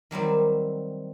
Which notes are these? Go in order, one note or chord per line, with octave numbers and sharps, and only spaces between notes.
D#3 F#3 G3 C4